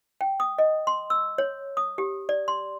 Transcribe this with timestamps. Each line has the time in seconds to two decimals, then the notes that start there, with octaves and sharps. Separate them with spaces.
0.21 G5
0.40 D#6
0.58 D#5
0.87 C6
1.10 E6
1.38 C#5
1.77 D#6
1.98 G4
2.29 D5
2.48 C6